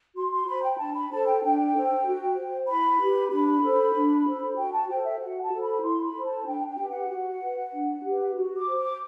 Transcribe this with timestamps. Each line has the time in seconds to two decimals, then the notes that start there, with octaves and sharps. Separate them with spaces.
0.15 F#4 C6
0.32 C6
0.47 C5 B5
0.62 G5
0.78 D4 A5
0.94 B5
1.11 A4 C5 A5
1.26 G5
1.42 D4 G5
1.73 A4 C5
2.05 F#4
2.36 C5
2.68 E4 B5
2.99 G4 B4
3.31 D4 B5
3.62 A4 C5
3.94 D4
4.26 A4 C5
4.57 F#4 G5
4.72 A5
4.89 A4 C5 G5
5.05 E5
5.20 F#4 F#5
5.42 A5
5.52 A4 C5
5.62 B5
5.83 E4 C6
6.04 B5
6.14 A4 C5
6.25 A5
6.46 D4 G5
6.68 G5
6.79 G4 B4
6.89 F#5
7.09 F#4
7.41 B4
7.73 D4
8.04 G4 B4
8.35 F#4
8.57 D6
8.67 C5
8.77 D6